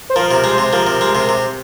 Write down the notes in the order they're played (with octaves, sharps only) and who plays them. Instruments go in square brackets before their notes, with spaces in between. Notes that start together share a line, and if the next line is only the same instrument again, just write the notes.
[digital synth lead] C5
[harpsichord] F3 [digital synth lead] A#4
[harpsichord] C3 [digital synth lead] A#4
[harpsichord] G#3 [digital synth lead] C5
[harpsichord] C3
[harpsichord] F3 [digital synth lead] A#4
[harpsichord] C3
G#3
C3
C3